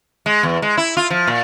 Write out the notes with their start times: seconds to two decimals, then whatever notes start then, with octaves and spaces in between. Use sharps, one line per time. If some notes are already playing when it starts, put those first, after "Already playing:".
0.26 G#3
0.43 E2
0.62 G#3
0.77 E4
0.97 F4
1.10 F3
1.27 A#2